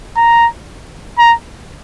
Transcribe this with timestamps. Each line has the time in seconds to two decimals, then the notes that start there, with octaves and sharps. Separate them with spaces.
0.16 A#5
1.18 A#5